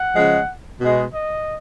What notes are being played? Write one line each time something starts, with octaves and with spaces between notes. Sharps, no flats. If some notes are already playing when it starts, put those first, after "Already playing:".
Already playing: F#5
C#3 F3 G#3
B2 G#3
D#5